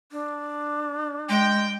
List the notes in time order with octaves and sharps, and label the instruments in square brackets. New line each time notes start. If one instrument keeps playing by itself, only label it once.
[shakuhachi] D4
[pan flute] G#3 [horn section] G5